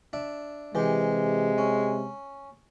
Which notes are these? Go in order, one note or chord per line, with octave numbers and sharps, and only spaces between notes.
D4 E5
C3 E3 G#3 G4
C#4